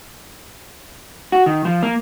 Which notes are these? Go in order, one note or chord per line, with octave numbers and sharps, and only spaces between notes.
F#4
D#3
F3
A#3